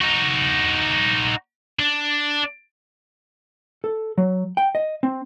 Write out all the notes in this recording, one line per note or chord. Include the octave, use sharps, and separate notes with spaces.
D#4 F#4
D4
A4
F#3
G5
D#5
C4